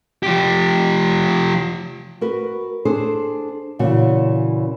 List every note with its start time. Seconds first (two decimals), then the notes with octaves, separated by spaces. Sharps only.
0.23 F3 G4
2.21 F#4 A#4 B4
2.85 D4 G#4 A4 C5
3.79 A#2 C#3 E3 F#4